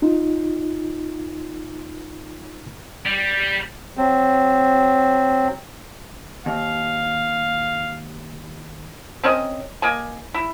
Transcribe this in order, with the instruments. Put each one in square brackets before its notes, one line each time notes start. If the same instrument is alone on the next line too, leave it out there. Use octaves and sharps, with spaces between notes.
[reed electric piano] D#4 F4
[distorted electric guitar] G3
[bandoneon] F#3 C4
[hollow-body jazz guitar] D#2 [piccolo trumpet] F5
[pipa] C4 C#4 A#4 D#5
A#3 D#5 G#5
E4